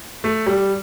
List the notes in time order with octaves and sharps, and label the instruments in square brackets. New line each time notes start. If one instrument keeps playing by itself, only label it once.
[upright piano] A3
G3